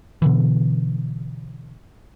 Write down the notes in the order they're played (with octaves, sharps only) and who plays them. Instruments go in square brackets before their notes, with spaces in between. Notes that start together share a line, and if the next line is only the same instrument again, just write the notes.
[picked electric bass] B2 D3 E3